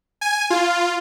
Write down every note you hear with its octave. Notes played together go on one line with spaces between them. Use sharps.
G#5
F4